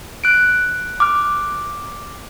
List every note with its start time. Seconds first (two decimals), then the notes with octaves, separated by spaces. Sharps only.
0.24 F#6 D7
1.00 D6 F6